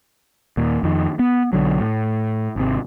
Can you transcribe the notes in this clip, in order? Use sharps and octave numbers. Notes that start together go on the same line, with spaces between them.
D#2 A#2
F2 D#3
B3
B1 D3 F#3
A2
G#1 C3